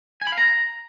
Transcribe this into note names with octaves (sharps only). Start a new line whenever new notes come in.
G#5
B5
F5
A#5